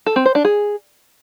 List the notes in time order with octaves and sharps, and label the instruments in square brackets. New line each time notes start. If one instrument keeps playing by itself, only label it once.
[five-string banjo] A4
C4
C5
D4
G#4